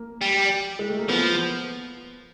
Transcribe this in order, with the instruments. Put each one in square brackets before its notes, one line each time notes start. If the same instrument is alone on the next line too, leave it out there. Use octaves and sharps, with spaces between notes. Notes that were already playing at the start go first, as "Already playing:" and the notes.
Already playing: [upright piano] A#3
[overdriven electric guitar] G3
[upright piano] G#3
A3
A#3
[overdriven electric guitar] F3 [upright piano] B3